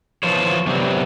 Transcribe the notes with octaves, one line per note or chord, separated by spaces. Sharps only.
E3 F3 F4 C5 C#5
C3 F#3 G3 B3 C4